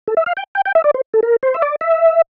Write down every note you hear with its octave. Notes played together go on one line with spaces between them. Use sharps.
A4
E5
F5
G5
G5
G5
E5
D5
C5
A4
A#4
C5
E5
D5
E5